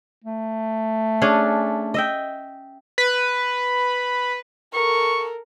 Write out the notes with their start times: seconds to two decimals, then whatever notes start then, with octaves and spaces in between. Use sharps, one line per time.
0.24 A3
1.22 C#4 D4 G#4
1.94 D#5 E5 G5
2.98 B4
4.74 A4 A#4 C#6